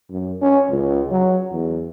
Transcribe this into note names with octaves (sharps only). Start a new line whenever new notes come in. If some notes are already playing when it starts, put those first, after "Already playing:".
F#2
C#4
C#2
F#3
E2